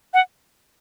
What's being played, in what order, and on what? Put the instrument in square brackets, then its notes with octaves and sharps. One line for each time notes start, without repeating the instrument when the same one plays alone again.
[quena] F#5